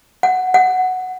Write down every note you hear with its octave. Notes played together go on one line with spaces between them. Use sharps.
F#5
F#5